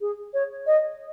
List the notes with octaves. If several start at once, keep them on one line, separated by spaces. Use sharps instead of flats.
G#4
C#5
D#5